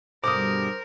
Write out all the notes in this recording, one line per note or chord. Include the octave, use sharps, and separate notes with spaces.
G2 B2 D3 A#4 C5 D6 D#6